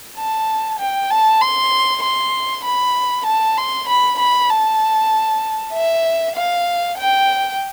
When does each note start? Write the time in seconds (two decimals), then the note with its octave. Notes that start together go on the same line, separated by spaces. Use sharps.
0.17 A5
0.79 G5
1.11 A5
1.41 C6
2.03 C6
2.64 B5
3.26 A5
3.57 C6
3.88 B5
4.19 B5
4.50 A5
5.73 E5
6.36 F5
6.98 G5